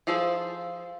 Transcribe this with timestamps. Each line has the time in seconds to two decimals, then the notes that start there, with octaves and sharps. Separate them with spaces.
0.07 F3 F4 G#4 A4 C5